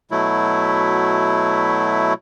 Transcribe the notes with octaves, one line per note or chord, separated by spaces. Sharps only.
B2 F#3 A3 E4